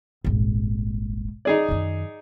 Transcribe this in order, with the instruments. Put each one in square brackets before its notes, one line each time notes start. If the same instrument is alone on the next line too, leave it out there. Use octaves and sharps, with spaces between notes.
[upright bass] D#1 G#1
[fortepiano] D#4 G#4 D5
[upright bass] F#2 D#3